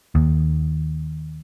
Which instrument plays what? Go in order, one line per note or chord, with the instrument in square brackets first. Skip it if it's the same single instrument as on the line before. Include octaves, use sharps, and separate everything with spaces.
[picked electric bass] D#2